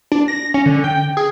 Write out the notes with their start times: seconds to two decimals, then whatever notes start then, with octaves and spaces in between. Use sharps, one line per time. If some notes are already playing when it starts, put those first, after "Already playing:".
0.12 D4
0.28 A#6
0.54 C#4
0.66 D3
0.84 G5
1.17 G#4